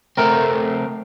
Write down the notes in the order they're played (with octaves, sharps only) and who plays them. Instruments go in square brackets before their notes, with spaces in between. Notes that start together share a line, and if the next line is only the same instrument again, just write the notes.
[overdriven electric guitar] A3 C4 [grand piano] A#4